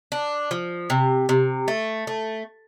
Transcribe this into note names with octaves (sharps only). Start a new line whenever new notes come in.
D4
F3
C3
C3
A3
A3